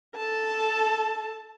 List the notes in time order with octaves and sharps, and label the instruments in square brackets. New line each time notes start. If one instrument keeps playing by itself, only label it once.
[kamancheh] A4 A5